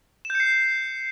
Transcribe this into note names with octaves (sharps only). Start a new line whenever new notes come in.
E7
G6
C#7
C7